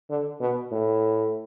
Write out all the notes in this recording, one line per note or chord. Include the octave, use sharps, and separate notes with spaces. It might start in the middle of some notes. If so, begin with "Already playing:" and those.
D3
B2
A2